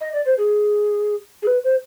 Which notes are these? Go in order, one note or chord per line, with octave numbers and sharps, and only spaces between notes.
D#5
D5
C5
G#4
G#4
B4
C5